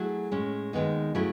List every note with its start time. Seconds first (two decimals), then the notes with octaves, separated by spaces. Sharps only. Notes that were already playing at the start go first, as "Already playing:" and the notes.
Already playing: F#3 A3 E4 G#4
0.31 A2 G#3 C#4
0.73 D#2 D#3 G#3 B3 D#4
1.15 C#3 F#3 A3 E4